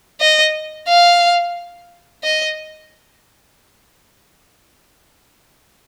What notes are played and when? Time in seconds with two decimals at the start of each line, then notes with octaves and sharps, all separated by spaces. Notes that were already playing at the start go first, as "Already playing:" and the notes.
0.21 D#5
0.89 F5
2.24 D#5